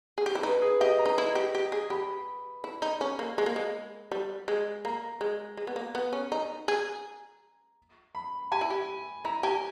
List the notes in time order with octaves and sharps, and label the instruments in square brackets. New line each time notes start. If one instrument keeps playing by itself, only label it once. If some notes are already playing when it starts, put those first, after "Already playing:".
[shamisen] G#4
G4
E4
[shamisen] D#4 [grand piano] B4
[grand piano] G#4
[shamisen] G4 [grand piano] D#5
[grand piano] A#5
[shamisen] D#4
E4
G4
G4
G#4
[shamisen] G4 [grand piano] B5
[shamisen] E4
D#4
C#4
A#3
G#3
A#3
G#3
G3
G#3
[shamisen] A#3 [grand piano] A#5
[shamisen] G#3
G#3
B3
A#3
B3
C#4
D#4
G#4
[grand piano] B5
[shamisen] G4 [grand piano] G#5
[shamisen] E4
G4
[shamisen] E4 [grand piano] A#5
[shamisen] G4 [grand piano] G#5